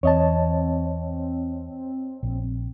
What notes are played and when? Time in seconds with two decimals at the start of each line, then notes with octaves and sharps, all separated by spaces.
0.03 E2 C4 C#5 D#5 A5
2.23 A#1